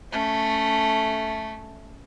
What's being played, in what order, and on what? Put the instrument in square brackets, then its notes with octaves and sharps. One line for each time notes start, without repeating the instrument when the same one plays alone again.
[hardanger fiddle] A3 C#4